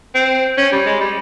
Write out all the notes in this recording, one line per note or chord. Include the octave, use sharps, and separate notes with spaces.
C4
C#4
G3
G#3
G3